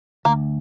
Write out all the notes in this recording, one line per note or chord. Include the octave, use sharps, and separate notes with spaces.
D2 A#3